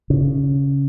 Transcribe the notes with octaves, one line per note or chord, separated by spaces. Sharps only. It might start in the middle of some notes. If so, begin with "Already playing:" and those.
C#3